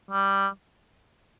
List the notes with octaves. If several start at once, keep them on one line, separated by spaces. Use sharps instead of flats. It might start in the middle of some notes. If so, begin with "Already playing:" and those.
G3